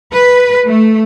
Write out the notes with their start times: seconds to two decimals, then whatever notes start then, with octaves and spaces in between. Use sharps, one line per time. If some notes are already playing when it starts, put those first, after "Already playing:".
0.12 B4
0.65 A3